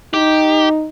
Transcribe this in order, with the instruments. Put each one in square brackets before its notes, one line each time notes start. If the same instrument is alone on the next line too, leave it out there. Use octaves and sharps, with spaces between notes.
[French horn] D#4 [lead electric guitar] G4